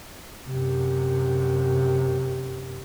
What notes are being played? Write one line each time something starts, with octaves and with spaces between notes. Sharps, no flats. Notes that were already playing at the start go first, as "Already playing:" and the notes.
F#2 C3